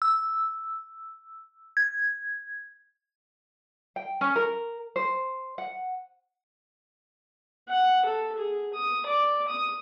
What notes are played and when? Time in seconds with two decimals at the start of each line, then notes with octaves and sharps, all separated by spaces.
0.02 E6
1.77 G#6
3.96 G5
4.21 C#4
4.36 A#4
4.96 C5
5.58 F#5
7.68 F#5
8.05 A4
8.38 G#4
8.73 D#6
9.06 D5
9.48 D#6